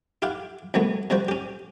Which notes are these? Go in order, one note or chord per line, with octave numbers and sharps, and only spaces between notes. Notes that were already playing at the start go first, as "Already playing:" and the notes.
E4 F4 G4 F5 F#5
C2 F#3 A3 B3
C3 F3 G3 F#4 C5
C#4 G4